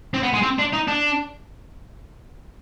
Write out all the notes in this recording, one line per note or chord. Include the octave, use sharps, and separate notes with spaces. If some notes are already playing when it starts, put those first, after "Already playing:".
C4
B3
G#3
C4
D4
D#4
D4